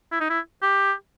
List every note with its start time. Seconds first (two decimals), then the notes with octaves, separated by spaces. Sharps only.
0.12 E4
0.21 D#4
0.30 E4
0.62 G4